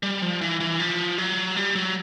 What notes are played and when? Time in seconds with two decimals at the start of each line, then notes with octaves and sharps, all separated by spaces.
0.03 G3
0.22 F3
0.41 E3
0.60 E3
0.79 F3
1.18 F#3
1.56 G3
1.76 F#3